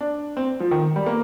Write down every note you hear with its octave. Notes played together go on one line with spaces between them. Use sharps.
D4
C4
F3
D#3
G3
A#3